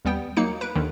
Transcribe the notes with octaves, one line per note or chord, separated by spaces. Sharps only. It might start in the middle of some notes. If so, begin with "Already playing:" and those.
D#2 G3 B3 G5
F#3 A#3 D#4 C#7
B4 D7
D#2 D3 D#3